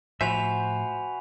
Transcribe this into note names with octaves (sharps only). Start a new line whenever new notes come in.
A2 F3 F#4 C5 E5 G#5 B5 F7